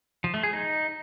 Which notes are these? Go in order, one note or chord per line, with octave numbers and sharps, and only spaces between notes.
F3
A3
G#4
D#4